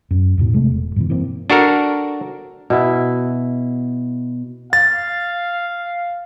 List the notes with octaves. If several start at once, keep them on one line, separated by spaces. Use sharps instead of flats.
F#2
E2 G#2 B2
C3 G#3 A3
E1
G2 B2 E3
E3 A#3 C4
D4 F#4 A4 A#4
B2 E4
F5 A6